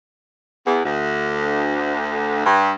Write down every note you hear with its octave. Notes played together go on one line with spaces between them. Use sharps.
E2
D2
G2